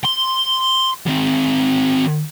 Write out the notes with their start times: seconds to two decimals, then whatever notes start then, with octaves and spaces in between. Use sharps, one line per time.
0.05 C6
1.07 D#3 C4